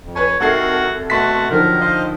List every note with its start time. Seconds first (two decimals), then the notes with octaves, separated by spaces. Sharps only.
0.03 F2
0.16 B4 C#5 G#5
0.40 C2 D#3 F#4 A4 A#4 F#5 G#6 C7
1.10 B2 A3 F#4 F#5 A5 C6 B6
1.51 D3 D#3 F3 F#3 A#4
1.80 C5 D#5 F5